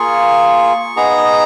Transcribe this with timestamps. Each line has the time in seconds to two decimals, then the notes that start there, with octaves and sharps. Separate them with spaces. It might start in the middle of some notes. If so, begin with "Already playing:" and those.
Already playing: A#3 F4 G#4 C#6
0.97 B3 D#4 G#4 A#5